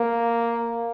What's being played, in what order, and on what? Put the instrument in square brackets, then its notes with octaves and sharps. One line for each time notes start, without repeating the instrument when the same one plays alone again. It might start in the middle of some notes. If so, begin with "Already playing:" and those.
Already playing: [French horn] A#3